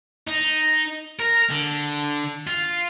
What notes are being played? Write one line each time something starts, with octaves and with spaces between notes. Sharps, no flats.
D#4
A#4
D3
F4